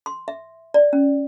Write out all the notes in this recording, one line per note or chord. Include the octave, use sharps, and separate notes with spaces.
C6
E5
D5
C#4